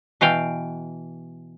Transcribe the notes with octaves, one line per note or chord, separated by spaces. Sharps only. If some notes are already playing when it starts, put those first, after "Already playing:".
B2 E3 F5 G5